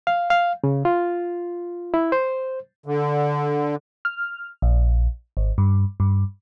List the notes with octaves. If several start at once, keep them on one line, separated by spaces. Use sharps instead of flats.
F5
F5
C#3
F4
E4
C5
D3
F6
A#1
G#1
G2
G2